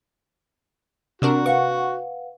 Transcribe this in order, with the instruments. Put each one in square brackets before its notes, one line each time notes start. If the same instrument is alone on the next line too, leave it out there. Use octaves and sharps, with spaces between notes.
[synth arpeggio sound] C3 D4 A#4 [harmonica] F#4
[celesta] B4 F5 F#5 [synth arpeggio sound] C#6